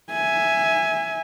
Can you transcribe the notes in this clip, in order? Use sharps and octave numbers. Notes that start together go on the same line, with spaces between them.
E5 G#5